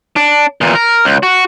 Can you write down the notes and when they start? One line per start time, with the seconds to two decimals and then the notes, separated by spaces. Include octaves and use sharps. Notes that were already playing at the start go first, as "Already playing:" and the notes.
0.16 D4
0.61 E2 A#2
0.75 A#4
1.05 C#2
1.23 F#4